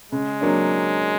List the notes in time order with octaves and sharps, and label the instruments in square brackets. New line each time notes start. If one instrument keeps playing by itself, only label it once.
[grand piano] C#3 [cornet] G#3
[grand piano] F#3 A#3 D4